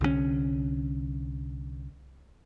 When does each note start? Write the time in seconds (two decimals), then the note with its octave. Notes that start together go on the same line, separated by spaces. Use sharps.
0.01 C2 D3 F#3 C#4